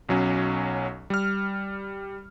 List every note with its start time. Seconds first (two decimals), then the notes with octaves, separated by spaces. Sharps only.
0.09 B1 F#3 C#4
1.10 G3 F6